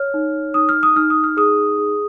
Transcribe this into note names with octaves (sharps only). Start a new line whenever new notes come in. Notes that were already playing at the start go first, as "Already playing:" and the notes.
Already playing: C#5 F6
D#4
D#4 D#6
F6
D#6
D#4 F6
D#6
F6
G#4 D#6
G#4